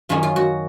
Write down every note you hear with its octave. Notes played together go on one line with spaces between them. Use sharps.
F#2 D#3 A#3 C#4 F4
F4
F#4